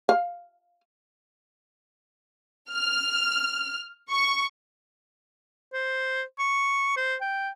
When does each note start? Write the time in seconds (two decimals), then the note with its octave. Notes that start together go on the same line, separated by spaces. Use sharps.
0.09 F5
2.70 F6
4.10 C#6
5.73 C5
6.39 C#6
6.97 C5
7.21 G5